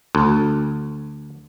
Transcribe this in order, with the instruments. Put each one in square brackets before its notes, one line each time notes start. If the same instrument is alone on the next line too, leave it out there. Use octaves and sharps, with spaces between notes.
[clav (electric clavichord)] D2